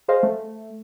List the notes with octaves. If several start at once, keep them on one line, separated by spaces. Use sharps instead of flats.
G#4 C5 D#5 F5
A3